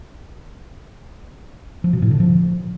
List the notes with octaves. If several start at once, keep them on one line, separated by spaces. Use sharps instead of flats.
F3
B2
A2
D3
F3